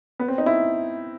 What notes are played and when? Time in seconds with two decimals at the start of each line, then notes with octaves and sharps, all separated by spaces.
0.20 B3
0.28 C4
0.38 D#4
0.46 E4